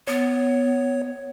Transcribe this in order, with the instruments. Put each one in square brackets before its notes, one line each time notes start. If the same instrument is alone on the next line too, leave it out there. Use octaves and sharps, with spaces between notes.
[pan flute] B3 [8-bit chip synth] C#5